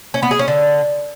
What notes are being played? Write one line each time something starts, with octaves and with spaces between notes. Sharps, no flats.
C#4
B3
G#4
C#4
D3